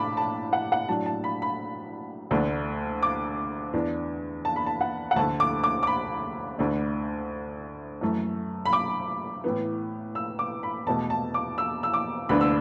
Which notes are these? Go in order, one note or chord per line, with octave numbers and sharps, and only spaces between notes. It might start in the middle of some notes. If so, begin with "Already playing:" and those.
Already playing: A2 D4 A5 B5 D6
A5
F#5
F#5
A2 F#3 D4 A5
A5
B5
B5
D2 D3 A3 D4
D6
E2 E3 D4
A5
B5
A5
F#5
F#5
D2 D3 A3 A5
D6
D6
D6
B5
D2 D3 A3 D4
F#2 E3 A3
B5
D6
A2 E3 B3
E6
D6
B5
E2 B2 A3 A5
A5
D6
E6
E6
D6
D2 D3 B3 D4 B5
E6